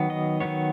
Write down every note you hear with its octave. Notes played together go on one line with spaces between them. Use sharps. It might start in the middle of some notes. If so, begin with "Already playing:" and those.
Already playing: D#3 F#3 B3
D#5
D#3 F#3 B3 C#5